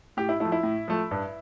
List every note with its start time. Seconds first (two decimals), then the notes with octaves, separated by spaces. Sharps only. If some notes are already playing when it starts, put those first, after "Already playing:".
0.17 A2 G4
0.29 E4
0.40 F3 A3 E4
0.52 E4
0.63 A2
0.88 F3 A3
1.11 G2